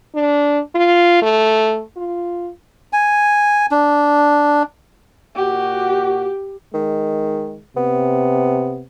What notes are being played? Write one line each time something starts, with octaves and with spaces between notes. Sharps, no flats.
D4
F4
A3
F4
G#5
D4
A#2 F#4 G4
D#3 G#3
C3 B3